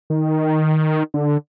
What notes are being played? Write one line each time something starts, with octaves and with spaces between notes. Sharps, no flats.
D#3
D3